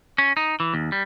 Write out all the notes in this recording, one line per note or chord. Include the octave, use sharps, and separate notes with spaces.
C#4
D#4
E3
D#2
G3